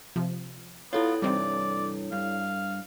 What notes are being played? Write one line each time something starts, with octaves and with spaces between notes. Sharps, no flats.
C3 F3
B3 E4 F4 A4 C#5
G2 C3 E3 G3 C4 D#4 D5
G2 F5